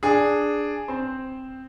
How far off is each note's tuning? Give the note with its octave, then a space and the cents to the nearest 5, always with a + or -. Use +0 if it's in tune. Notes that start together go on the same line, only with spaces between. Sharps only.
D4 +0 G#4 +0
C4 +0 C5 +0